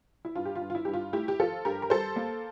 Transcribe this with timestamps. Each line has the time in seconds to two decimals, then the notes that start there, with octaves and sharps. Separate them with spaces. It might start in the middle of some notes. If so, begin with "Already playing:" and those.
0.25 E4
0.36 G2 F4
0.45 G4
0.55 F4
0.61 G2
0.70 F4
0.75 E4
0.85 G2 G4
0.93 F4
1.13 A3 E4 G4
1.28 G4
1.40 F3 F4 A4
1.65 G2 G4 A#4
1.82 A#4
1.90 G3 A4 C5
2.16 A#3